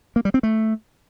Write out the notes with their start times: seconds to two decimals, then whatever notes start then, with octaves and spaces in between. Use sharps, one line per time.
0.16 A#3
0.25 G3
0.34 C4
0.43 A3